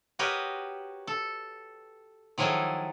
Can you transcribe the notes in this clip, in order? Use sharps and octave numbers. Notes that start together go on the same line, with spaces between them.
F#4 G4 A#4 B4 C#5 D#5
A4
D#3 F3 F#3 E4 G#4 A4